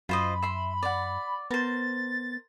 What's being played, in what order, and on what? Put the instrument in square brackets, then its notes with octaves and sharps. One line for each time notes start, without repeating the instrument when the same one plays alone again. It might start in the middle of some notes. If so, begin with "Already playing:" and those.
[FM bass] F#2 [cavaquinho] F4 C5 D#5 [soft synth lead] B5
[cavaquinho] E5 C6
D5 F#5
[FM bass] B3 [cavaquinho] A#4 C5 [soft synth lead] A6